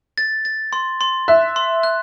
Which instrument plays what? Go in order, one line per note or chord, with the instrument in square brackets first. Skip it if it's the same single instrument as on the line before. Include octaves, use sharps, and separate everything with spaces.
[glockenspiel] A6
A6
C6
C6
[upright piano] E5 [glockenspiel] F#6
[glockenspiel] C6
F#6